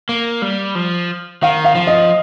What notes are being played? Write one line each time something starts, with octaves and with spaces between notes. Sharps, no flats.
A#3
G3
F3
D#3 F5
F5
F3
D#5